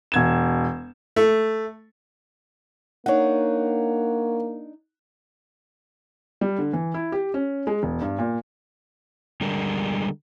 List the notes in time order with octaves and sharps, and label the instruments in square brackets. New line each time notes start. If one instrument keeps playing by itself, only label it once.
[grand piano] E1 G#6 E7
[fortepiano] A3
[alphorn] A#3 [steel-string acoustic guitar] D4 D#4 [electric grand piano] C#5 F#5
[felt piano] G3
D3
E3
E4
G4
C#4
G#3
E1
G2
A#2
[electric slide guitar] D3 G3 G#3 D4 A#4